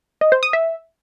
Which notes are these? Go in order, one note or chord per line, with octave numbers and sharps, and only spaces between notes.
D#5
C5
D#6
E5